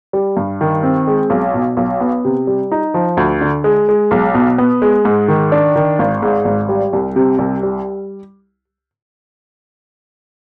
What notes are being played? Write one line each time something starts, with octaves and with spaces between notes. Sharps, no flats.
G3
G2
D#3
C4
G#3
B1
B2
B1
B3
C3
G3
D#4
F3
D2
D3
G#3
G#3
B1
B2
B3
G#3
G#2
D#3
D4
D#3
G#1
G#2
G#1
G3
C2
C3
C2
G3